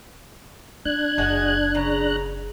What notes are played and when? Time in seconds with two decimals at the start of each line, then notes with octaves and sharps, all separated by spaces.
0.85 C4 D4 F#6 G#6
1.18 F#1 G#3 F#4 G#4
1.75 C#3 A#5